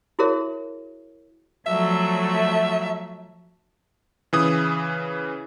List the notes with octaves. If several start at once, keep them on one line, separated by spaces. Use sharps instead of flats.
E4 F#4 G#4 A#4 C#5 E5
F3 F#3 A3 E5
C#3 E3 D#6